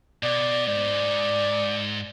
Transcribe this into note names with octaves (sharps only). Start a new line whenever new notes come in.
B2 D5
G#2 D5